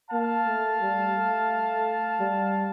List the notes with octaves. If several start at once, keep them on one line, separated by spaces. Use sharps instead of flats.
A#3 F5 A5
A3
G3
A3
G3